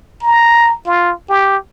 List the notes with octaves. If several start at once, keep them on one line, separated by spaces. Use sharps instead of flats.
A#5
F4
G4